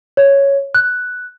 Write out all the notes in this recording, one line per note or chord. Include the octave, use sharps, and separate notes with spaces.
C#5
F#6